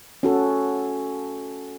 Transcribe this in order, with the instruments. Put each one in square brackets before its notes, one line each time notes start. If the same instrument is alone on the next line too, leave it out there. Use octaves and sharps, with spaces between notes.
[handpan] C#4 F#4 A4